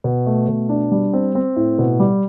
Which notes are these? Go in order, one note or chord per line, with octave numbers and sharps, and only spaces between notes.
B2
A3
B2
D4
G3
C4
C4
A2
B2
G3